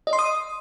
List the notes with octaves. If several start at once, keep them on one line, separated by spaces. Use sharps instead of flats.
D#5
C6
D#6